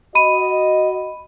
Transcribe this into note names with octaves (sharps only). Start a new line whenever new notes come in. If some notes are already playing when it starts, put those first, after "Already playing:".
F#4 D#5 B5 D#7